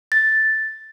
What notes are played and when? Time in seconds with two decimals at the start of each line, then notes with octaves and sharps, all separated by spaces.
0.12 A6